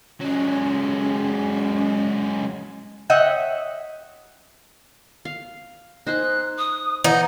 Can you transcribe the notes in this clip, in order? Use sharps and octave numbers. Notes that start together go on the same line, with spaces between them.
F#3 G#3 C#4
C#5 D#5 E5 F#5 G5
F5
D#4 C5 G#5 F#6
D#6
E3 D#4 F#5